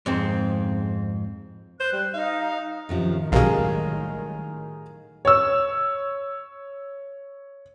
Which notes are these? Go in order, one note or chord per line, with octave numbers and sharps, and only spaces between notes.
F2 G#2 C4
C5 F#6
G3
D#4 F5
F#2 A2 C3 D#3 F3 F#3
B1 B2 G3 G#3 C#4 G#4 A#4 F5
C#5 E6